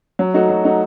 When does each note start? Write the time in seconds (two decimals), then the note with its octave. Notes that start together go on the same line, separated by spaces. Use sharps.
0.19 F#3
0.34 A3 D#4 F#4
0.49 F#3
0.64 A3 D#4 F#4